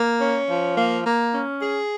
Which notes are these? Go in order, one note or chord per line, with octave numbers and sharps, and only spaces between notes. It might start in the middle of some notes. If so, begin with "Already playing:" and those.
Already playing: A#3
C#4
F3
A#3
A#3
C#4
G#4